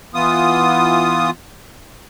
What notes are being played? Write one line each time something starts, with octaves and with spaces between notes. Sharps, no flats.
E3 B3 F4 D#6